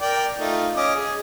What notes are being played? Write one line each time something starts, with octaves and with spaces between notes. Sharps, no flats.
A#4 D5 G5
A3 D#4 F4
C#4 D#5 D6
G#4